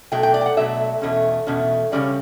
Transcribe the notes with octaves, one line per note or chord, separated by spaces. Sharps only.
B2 F#3 A3 G5
G5
D5
G5
F#5
B2 F#3 A3 E5
E2 B2 A3 C#4
E2 B2 A3 C#4
C#3 E3 G3 C#4 D5
C#5